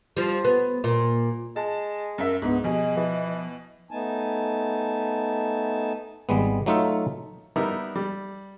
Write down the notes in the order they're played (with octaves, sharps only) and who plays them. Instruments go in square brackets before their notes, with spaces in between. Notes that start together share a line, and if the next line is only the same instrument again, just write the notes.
[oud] F3 G3
B3
A#2
[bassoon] G#3 [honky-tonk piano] A5
[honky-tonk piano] F#2 E5 [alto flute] A#4
[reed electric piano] C#2 D4 [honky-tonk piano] G#2 [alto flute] B3
[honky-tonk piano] B2 [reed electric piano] F3 G4 [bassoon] G#4 [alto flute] D#5
[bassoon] E3 [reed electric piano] F3
[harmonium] A3 B3 D#4 G#5 A5
[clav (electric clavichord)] G#1 G3 G#3 B3
F#3 A3 D#4 F4 E5
[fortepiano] G3 B3 D#4 E4 A#4
G3